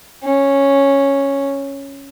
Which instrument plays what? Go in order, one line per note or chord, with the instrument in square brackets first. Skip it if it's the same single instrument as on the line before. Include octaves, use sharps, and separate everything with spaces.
[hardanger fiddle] C#4